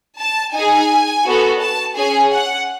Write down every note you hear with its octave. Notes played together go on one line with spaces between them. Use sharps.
A5
D#4 G#5
G#4
B3 F#4 A4
A5
C#4 G#4 G#5
F#5